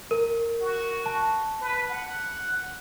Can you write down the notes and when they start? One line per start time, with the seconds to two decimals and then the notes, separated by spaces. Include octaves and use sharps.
0.11 A#4
0.62 F#4
1.06 A5
1.61 B4
1.90 F#5